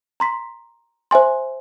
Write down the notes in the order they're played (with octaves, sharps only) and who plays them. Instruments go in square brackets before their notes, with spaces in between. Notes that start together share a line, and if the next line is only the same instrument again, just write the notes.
[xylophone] A#5 C6 B6
C5 E5 G#5 C6